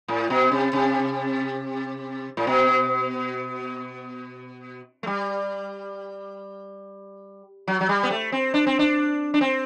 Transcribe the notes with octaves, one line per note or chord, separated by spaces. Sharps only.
A2
B2
C3
C3
A2
B2
A3
G3
F#3
F#3
G3
B3
A3
C4
D4
C4
D4
D4
C4